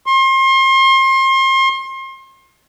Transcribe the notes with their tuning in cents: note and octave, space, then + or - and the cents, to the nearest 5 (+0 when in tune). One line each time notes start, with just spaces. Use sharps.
C6 +35